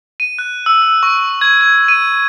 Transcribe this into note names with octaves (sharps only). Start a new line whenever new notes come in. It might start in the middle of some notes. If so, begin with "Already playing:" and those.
D#7
F#6
E6
E6
C#6
G#6
G#6
D#7